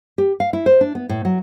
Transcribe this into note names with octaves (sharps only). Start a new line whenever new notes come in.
G4
F5
E4
C5
D4
B3
A2
F#3